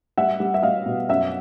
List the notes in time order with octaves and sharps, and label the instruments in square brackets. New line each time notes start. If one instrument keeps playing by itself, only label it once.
[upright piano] G3 E5 F#5
G3
E5
G3 D#5 F5
B2
F#2 E5 F#5